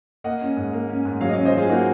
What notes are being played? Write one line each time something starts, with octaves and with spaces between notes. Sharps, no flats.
A#3 D#5 F#5
C#4
G#2
A#3
C#4
G#2
F#3 C#5 F5
D#5
C#5 F5
C#4
C5 D#5
F#3 F4 G#4
A#3 D#4 F#4